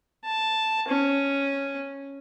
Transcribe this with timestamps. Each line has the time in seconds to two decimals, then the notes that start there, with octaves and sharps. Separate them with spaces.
0.25 A5
0.88 C#4